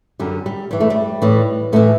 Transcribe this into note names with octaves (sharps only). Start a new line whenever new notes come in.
F#2 D3 G3
G3
G2 E3 G3
A3
G3
A2 E3
A2 E3 A3